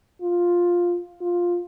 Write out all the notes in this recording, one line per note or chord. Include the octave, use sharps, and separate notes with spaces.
F4
F4